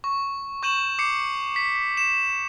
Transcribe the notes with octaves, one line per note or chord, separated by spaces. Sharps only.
C#6
C#6 G6 D#7 E7 F#7
D6 C7 C#7
B6
E7